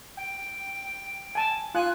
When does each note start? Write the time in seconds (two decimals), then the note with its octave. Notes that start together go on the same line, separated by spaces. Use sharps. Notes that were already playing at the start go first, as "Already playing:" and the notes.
0.17 G5
1.35 G#5 A5
1.75 F4 G#5 F#6